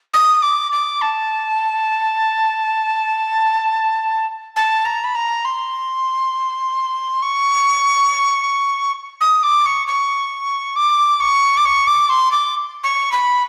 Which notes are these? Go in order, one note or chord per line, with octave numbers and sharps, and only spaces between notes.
D#6
D6
D6
A5
A5
A#5
B5
A#5
C6
C#6
D#6
D6
C#6
C#6
D6
C#6
D6
C#6
D6
C6
D6
C#6
B5